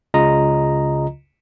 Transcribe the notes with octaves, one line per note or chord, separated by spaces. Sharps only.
C#2 C#3 F4 D#5 A#5